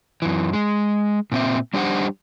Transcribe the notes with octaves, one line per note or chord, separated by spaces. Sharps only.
F#2 E3
G#3
A#2 C4 E5
G3 D4 G4 C5 F#5